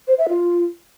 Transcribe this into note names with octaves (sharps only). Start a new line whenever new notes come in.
C5
E5
F4